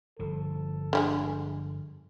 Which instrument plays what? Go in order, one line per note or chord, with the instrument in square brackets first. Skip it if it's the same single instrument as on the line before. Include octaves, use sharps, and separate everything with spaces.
[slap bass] G1 F3 [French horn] A4
[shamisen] D3 G3 G#3